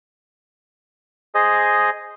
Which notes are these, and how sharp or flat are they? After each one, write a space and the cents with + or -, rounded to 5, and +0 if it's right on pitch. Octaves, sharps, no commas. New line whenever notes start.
G#4 +0 C5 +0 D#5 +0